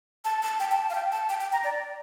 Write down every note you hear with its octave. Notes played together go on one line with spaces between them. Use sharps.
A5
A5
G5
A5
F5
G5
A5
G5
G5
A#5
D5